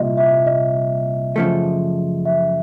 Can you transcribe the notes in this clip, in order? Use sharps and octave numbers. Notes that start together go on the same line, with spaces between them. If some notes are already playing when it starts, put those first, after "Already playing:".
Already playing: C2 A#2 G3 D#5 E5
E5
D#5
F#2 C#3 F3 A3
E5